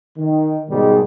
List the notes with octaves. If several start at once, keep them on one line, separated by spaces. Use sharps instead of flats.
D#3
G#2 B2 D#3 G3 G#3